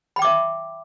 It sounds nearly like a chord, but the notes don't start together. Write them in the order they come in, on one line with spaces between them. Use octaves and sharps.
B5 G5 D6 E5